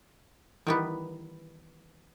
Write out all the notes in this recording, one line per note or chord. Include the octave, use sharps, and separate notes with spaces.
D#3 E3 G3 B3 B4